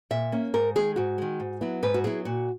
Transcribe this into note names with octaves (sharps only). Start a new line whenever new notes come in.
A#2 E5
A#3 C#4
G#2 A#4
D#3 G#3 G#4
G#2 F#4
D#3 G#3
G#2
F#3 B3 E4
G#2 B4
F#4
F#3 B3 E4 G#4
A#2 F#4